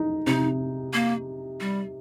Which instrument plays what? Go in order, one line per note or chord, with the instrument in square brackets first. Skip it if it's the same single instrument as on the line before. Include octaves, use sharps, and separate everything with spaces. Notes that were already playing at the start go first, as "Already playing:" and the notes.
Already playing: [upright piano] D#4
[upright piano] C3 [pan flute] D#4
[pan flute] A#3
G3